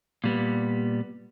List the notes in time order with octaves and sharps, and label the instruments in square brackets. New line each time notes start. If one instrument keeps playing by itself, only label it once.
[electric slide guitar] A#2 G3 B3